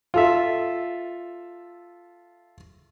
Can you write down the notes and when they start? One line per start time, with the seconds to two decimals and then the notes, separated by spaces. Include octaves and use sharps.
0.14 F4 A4 E5